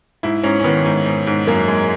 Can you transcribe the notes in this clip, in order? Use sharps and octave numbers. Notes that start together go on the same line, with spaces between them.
G#2 E4
G#2 C#4
C#4
D#3 B3
G#2
G#2
G#2
F#2 A#3
G#3